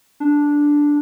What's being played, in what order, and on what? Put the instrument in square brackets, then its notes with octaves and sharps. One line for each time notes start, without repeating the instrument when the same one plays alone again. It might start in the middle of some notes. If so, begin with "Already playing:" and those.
[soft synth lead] D4